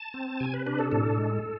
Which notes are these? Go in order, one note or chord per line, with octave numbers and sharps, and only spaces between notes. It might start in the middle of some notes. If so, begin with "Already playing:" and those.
Already playing: A5
C4
C3 G#5
B4
D4 B4
A4
A2 A4
G#3